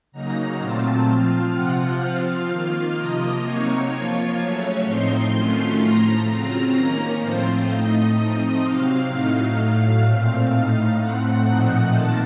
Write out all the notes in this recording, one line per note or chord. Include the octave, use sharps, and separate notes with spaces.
C#3 F#3 A#3 D#4 A#5
A#2 F#3 A3 C4 F4 A5
F3 C4 F4 F5
C3 F3 C4 F4 F#5
F3 C4 F4 F5
D#3 A#3 F4
C3 F3 A#3 F4 D#5
C3 F#3 A#3 D#4 C#5
F3 A#3 F4
C#3 F#3 A3 C#4
A2 F3 C4 D#4 C6
D#3 F#3 A3 C#4 F4
A2 F3 A3 A#5
C#3 F#3 C4 F4 A#5
D#3 A#3 C#4
A2 F3 A3 C4 F4 C5
A2 A3 D#4 D#5
F3 A3 C4 D#4
C3 F#3 C4 F5
A2 F#3 A3 D#4 F5
A2 F#3 A3 F5
A#2 A3 C4
A2 A3 D#4 F5
A2 A3 C4 F#5
A#2 F3 A3 C4 D#4
D#3 A#3 A5